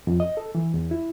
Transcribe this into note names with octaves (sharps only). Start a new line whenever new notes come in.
F2
D#5
A4
E3
E2
E4